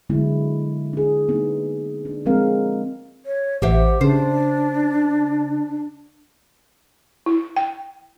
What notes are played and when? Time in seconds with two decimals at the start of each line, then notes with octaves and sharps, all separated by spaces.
0.10 D3 F#3 G#3 B3 E4
0.93 D4 G#4
1.28 A#3 B3 D#4
2.05 D4
2.26 F3 G#3 C4 A#4 F5
3.26 C#5
3.62 A1 G4 C5 E5 F#5
4.01 C#3 D4 C5
7.26 E4
7.56 G5